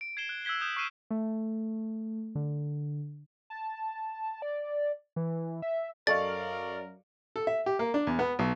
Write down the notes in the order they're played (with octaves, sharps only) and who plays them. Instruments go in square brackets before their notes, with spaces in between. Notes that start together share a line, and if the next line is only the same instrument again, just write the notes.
[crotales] D7
G#6 C7 E7 G7
F#6
E6 F#6 G#6 B6 G7
D#6 G6 E7
C#6 E6 F6 C7 D#7 E7
[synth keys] A3
D3
[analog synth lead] A5
D5
E3
E5
[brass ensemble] F#2 A#4 [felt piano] A4 D#5 C#6 [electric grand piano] D5 F5 [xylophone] A6
[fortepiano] A4
E5
G4
A#3
D4
E2
B3
B1